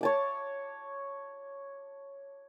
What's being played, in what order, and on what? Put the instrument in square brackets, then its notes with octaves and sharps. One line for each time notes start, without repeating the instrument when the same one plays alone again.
[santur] C#5 A5 D6